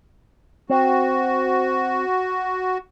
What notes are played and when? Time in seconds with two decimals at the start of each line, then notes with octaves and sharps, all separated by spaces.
0.70 C4 F#4